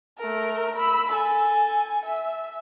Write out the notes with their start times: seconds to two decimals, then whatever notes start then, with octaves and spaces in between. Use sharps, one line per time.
0.18 A3 A#4
0.76 B5 E6
1.09 A4 G#5
2.06 E5